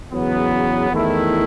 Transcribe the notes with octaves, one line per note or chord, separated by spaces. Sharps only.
E2 C#3 F#3 B3
E2 D#3 A3 E4